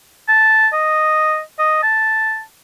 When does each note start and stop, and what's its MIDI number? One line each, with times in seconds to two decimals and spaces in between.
0.29 0.68 81
0.73 1.41 75
1.59 1.80 75
1.83 2.41 81